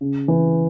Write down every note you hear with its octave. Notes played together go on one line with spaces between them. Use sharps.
C#3
E3